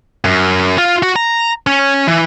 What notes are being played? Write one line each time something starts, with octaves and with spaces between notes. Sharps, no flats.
F#2
F4
F#4
A#5
C#4
E3